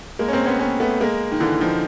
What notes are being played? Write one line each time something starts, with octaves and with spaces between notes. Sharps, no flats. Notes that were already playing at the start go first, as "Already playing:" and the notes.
G#3 A#3
C#4
A#3 C4
B3 C#4
B3 C#4
A3 B3
G#3 A#3
D#3
D3 E3
D#3 F3